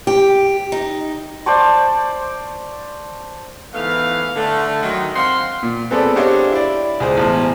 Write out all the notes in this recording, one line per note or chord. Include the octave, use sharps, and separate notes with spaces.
G4
D#4
C5 D5 A5 C#6
G#2 E3 A3 B3 F5
D3 A3
D#3 F#3 G#3
C4 F5 F#5 C6
A#2
B3 C4 G#4 A4 B4 D5
D4 G4 C5 C#5 D#5 F5
E4 D5
C#2 G#4 C5
A1 E2 C5